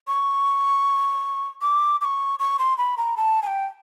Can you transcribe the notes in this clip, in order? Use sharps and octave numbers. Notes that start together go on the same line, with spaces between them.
C#6
D6
D6
C#6
C#6
C6
B5
A#5
A5
G#5
G5